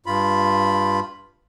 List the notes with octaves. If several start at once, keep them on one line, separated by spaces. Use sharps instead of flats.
G2 F4 B5